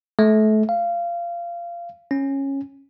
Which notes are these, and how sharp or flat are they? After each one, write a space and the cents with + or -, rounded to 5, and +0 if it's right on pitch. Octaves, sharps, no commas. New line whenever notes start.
A3 -30
F5 -20
C#4 -15